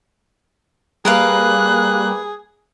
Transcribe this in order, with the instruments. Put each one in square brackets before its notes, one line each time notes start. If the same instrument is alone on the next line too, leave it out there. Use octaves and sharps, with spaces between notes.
[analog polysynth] G3 A#3 [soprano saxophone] G#4 [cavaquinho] A#4 B4 F5 [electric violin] F#6